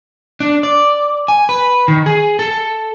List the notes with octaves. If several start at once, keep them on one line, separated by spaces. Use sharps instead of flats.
D4
D5
G#5
B4
D#3
G#4
A4